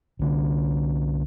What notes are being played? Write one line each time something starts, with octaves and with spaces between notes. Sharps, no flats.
C2 D3 D4